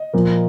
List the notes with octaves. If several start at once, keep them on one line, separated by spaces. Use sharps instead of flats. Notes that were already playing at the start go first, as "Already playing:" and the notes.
Already playing: D#5
A#2 F3 A#3